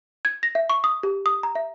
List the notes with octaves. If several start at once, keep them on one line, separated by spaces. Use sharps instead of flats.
G#6
A#6
E5
C#6
D#6
G4
D#6
A#5
E5